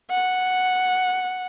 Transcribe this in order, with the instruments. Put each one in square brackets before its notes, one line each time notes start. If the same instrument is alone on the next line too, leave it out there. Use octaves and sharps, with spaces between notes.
[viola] F#5